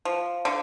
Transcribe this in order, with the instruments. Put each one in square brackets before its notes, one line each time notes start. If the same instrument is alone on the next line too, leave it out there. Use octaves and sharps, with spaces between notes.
[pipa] F3
D3